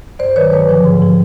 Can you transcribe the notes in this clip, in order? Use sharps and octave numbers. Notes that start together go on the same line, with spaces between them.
G2 C5 D5
D#3 F#3 B4 C#5
G2 B4 C#5
D3 F3
G#2
F3